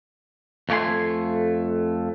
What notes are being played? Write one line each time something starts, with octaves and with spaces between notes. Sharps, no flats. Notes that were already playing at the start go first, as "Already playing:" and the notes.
F2 A3 G4 G#5 C6